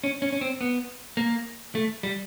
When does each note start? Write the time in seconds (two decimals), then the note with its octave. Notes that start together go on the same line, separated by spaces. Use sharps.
0.04 C#4
0.22 C#4
0.32 C#4
0.41 C4
0.61 B3
1.17 A#3
1.75 A3
2.03 G3